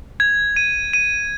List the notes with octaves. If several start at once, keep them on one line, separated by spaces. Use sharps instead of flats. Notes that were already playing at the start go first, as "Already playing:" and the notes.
G#6
D#7
D#7